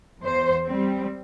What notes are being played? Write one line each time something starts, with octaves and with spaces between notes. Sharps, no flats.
E2 C5
G3 C4